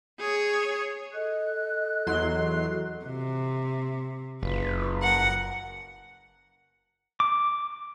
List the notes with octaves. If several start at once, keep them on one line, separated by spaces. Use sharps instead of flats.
G#4 C#5
A4 D#5 F#6
E2 F#3 C6
C3
F#1 F4 B4
A#4 F#5
D6